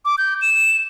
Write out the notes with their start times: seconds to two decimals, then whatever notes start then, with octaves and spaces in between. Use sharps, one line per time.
0.05 D6
0.18 G6
0.42 E7